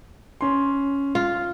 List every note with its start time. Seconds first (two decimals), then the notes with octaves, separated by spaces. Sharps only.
0.41 C#4 C6
1.15 F4